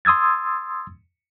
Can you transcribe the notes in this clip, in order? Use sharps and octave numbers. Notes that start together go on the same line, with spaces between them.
C6 D#6 E6 G#6 A6